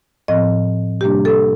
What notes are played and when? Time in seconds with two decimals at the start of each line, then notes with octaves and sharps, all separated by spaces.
0.28 A2 F3 C4 D#5
1.01 C3 G3 A#3 D4 G4
1.25 A4